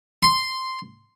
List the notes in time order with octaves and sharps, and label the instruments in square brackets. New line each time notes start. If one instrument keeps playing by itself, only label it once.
[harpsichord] C6